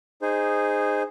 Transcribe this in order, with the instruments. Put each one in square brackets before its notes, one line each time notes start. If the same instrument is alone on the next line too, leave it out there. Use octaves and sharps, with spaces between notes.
[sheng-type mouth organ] D#4 G#4 C5